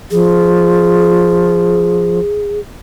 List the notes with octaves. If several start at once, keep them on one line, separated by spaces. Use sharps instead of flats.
F3 G#4